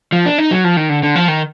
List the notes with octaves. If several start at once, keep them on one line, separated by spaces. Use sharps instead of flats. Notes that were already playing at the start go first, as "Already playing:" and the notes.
F3
D4
D#4
F#3
F3
D#3
D3
D3
F3
D#3